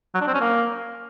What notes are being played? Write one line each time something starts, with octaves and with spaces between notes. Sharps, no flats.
F#3
D4
C4
C#4
A#3